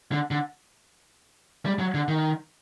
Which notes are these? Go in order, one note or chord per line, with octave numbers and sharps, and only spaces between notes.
D3
D3
G3
F#3
D3
D#3